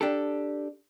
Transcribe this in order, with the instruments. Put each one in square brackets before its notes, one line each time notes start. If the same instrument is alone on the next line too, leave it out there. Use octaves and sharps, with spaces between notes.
[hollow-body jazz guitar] D4 G4 A4